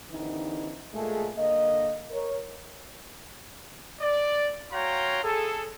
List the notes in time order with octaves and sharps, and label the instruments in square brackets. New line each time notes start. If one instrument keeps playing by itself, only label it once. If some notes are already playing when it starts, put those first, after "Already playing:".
[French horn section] D#2 D3 E3 C4 D#4
A#2 G#3 A3 G#4 A4
D3 A#3 D#5
A#4 C#5
[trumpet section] D5
F#4 C#5 F5 G5 A#5 C6
G#4 A4